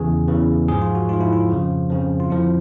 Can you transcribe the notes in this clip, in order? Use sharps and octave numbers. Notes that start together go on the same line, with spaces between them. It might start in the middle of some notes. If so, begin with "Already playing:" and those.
Already playing: E2 C#3 E3 G#4
E2 C#3 E3
G#2 F3 G#4
F4
F#4
G#2 F3 F4
E4
F4
F2 C#3 F3
F2 C#3 F3
F4
F2 D3 F3 E4